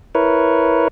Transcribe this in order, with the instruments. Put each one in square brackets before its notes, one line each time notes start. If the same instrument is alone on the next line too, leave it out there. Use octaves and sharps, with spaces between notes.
[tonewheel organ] E4 A#4 B4 C#5